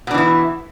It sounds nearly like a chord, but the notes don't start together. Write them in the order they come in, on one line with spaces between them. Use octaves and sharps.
B2 D4 E3 E4